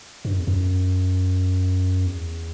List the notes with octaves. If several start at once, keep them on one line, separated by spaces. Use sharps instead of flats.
G2
F#2
E2
F#2
E2